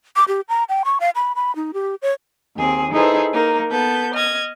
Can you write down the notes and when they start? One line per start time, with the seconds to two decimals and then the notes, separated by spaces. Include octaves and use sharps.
0.16 D6
0.28 G4
0.49 A#5
0.69 G5
0.85 C#6
1.00 F5
1.16 B5
1.36 B5
1.56 D#4
1.74 G4
2.02 C#5
2.57 D#2 C4 G#4
2.92 D#4 E4 G#4 A4 B4 C5
3.32 A#3 D#4 A#4
3.70 B3 A4 B4 G6
4.13 D#5 F6 G#6